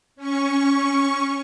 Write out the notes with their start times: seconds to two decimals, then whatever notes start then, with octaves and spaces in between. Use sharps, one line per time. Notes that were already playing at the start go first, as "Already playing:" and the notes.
0.16 C#4 C#6